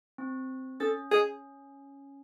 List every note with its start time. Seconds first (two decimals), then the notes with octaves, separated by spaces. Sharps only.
0.18 C4
0.80 C#4 A4
1.11 G#4